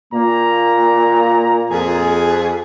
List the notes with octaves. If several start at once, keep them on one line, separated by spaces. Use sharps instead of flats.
A#2 A#3 A#5
F2 G#4